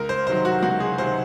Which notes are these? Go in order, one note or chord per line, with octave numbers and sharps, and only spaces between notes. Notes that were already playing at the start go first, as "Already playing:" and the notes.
Already playing: C#2 A#4
C5
C3 D#3 F#3 C5
F#4
C#2 F#4
G#4
C3 D#3 F#3 C5